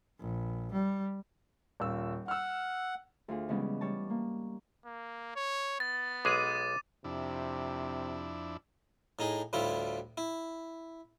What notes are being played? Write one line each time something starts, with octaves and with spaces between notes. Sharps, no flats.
A#1
G3
D#1 F4 E6
F#5 E6 F6
D2 F4 G#4
C#3 E3 G3 G#3 B3 C#4
G3 C#5 A5
A#3
A#3
C#5
B3 A6
B1 G#3 G#4 D6 D#7
F2 C3 D4 E4
A2 D#4 G#4
D2 A2 G3 E4 F4
E4